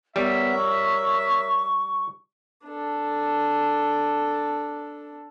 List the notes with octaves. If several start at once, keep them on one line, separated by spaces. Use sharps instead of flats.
G3 B3 A#4 C#5 E5
C#6
D4 A4